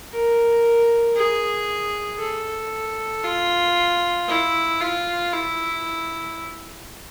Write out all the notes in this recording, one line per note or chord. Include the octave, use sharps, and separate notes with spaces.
A#4
G#4
A4
F4
E4
F4
E4